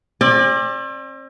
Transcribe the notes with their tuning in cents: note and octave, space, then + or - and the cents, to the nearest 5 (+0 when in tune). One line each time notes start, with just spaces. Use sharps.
C4 +45 D5 +20